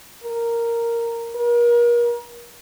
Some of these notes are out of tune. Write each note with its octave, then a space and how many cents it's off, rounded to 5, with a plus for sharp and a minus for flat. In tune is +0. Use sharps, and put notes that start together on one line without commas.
A#4 -5
A#4 +35